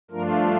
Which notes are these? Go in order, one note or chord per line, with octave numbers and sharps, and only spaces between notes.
G2 F3 A3 D4 F4 A#4